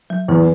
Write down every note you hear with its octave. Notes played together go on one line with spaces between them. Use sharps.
F#3
E2 E3